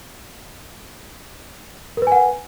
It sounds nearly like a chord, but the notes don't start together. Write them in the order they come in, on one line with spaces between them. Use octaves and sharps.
A#4 B4 G#5 F#5